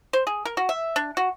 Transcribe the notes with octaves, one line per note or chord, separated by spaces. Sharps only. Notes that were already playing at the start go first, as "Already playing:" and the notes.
C5
G#4
A#4
F#4
E5
D4
F#4